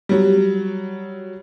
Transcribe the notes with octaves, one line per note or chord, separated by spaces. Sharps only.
F#3 G3